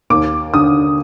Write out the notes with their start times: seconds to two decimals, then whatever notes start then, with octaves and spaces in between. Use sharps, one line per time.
0.10 D#2 D6
0.53 D3 D#6